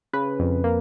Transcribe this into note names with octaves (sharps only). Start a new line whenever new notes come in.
C#3 B4
F2
A#3